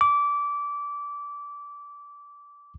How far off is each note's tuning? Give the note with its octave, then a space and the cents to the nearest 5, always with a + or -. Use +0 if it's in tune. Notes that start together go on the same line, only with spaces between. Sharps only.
D6 -20